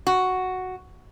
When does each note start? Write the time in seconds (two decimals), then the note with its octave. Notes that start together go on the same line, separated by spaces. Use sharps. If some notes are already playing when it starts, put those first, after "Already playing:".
0.07 F#4